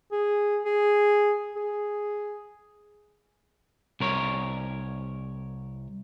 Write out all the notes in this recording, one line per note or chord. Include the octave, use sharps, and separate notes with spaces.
G#4
G#4
G#4
C2 A#4 C#5